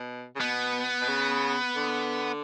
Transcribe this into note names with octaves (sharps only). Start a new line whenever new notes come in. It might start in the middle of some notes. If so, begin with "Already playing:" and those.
Already playing: B2
C#3
B2 B3
B2
C#3
D3